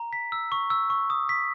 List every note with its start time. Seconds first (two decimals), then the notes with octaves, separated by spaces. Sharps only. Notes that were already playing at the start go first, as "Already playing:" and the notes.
Already playing: A#5
0.13 B6
0.32 E6
0.52 C#6
0.70 E6
0.90 C#6
1.10 D#6
1.29 B6